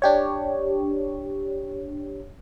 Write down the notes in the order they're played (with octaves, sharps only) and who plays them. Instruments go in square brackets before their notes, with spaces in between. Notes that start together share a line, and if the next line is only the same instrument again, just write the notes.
[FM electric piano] D4 G4 C#5